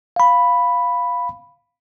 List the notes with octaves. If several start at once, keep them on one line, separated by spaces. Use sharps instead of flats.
F5 B5